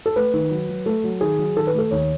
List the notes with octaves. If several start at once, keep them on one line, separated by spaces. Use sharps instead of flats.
A4
A3 B4
D#3
F#3
F#3
A3 A4
F#3
D#3 G#4
F#3
D#3 A4
B4
A3 A4
D#2 C#5